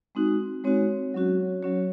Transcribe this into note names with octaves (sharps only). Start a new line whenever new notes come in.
G#3 C4 D#4 F#4
G#3 C4 D#4 F#4 C#5
F#3 C#4 F#4
F#3 C#4 F#4 C#5